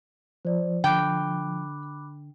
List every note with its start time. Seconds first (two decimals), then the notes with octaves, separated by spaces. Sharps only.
0.45 F3 C5 D5
0.84 D3 G5 B5 D6 F#6